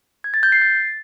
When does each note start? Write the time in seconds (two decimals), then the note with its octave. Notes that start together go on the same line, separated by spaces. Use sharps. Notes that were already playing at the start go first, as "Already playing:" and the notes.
0.24 G#6
0.34 A6
0.43 G6
0.52 C7
0.62 A6